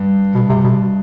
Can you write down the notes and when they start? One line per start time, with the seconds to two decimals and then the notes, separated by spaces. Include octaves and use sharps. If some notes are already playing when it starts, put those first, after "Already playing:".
Already playing: G2
0.35 B2
0.49 G2 C3
0.64 B2